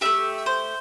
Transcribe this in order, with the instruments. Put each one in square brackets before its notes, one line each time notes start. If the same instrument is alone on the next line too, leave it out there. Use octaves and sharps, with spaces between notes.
[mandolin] A3 D4 G4 E5
C5